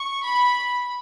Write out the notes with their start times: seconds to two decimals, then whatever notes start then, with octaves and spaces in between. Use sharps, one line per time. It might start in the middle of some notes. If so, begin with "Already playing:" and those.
Already playing: C#6
0.23 B5